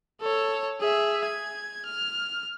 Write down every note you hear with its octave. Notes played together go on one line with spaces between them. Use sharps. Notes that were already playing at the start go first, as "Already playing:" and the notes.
A4 C#5
G#4 E5
G#6
F6